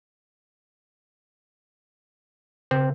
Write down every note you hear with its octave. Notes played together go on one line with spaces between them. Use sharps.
C#3 C4